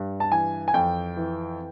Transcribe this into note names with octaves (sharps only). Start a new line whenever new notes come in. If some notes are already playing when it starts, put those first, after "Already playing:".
Already playing: G2
A5
E3 G#5
G#5
F2 G5
E3